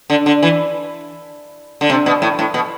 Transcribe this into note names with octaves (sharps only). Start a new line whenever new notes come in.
D3
D3
E3
D3
C3
B2
A2
A2
B2